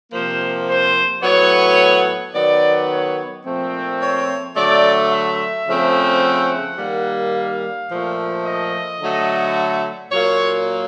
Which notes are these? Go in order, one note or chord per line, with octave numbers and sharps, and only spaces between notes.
C3 F3 A#3 C5
C5
A2 F#3 B3 C#5
D#3 F#3 B3 D5
C#5
A#2 F3 A3 C4
C#5
D3 F#3 A3 D5
E5
C#3 F3 A3 C4
F#5
D#3 G3 A#3
F5
A#2 F3 A3
D#5
D3 F#3 A3
A#2 F#3 A#3 C#5